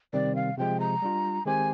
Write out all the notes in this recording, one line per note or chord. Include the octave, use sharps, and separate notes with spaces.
C3 D#3 G3 C4 D5
F5
C3 F3 G#3 G5
A#5
G3 D4 F4
D#3 G#3 C4 G4 C5 G#5